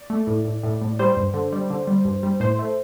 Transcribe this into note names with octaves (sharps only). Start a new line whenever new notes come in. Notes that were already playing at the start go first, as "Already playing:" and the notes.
Already playing: D5
A3
A2
A2
A2
A2
G3 C5
G2
D3
G3
D3
G3
G2
G3
A2 C5
A3